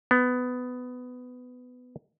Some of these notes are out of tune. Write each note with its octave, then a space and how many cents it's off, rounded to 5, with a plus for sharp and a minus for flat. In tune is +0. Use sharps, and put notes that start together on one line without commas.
B3 +15